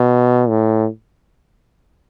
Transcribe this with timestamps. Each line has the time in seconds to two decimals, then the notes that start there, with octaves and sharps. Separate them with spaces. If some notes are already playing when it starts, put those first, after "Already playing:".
Already playing: B2
0.49 A2